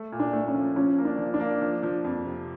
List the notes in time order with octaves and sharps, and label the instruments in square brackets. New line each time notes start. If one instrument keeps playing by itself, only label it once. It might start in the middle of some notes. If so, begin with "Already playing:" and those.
Already playing: [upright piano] A3
A#2
[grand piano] D4
[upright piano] A3
[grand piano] C#4
[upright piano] F3
[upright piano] F3 [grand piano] C#4
[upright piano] A#3
[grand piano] D4
[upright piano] F3
[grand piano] D4
[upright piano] A#3
F3
F3
F2
C3